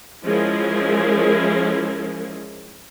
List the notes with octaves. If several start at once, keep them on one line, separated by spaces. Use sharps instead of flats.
F3 G#3 C#4 E4 G#4 A#4